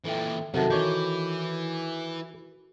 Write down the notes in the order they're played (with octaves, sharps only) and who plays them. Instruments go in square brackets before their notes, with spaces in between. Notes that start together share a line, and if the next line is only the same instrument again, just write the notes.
[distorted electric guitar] A#2 E3 [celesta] A4 E5 G5
[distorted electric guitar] F#2 [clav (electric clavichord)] C3 D#3 [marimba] F#4 A4 [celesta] E5 F#5 A5
[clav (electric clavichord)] D#3 C#5 [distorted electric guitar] E3 [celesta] D6 G6